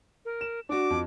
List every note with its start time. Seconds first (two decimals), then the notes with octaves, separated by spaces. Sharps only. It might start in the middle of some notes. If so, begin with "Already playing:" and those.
0.25 A#4
0.41 E7
0.69 D4 F#4 D6
0.90 F2